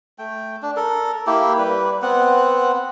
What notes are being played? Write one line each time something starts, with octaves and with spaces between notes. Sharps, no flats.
A3 G5
D4
A4 A#4
A#3 E4 G4
G3 B4
B3 C4 F#5